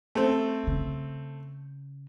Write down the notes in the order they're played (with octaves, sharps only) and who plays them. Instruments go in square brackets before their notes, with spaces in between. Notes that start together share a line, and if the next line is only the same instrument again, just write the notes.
[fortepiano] A3 C4
[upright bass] C#3